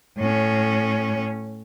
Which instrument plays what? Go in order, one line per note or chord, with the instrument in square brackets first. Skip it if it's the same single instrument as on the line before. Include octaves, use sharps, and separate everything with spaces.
[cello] A2 C#4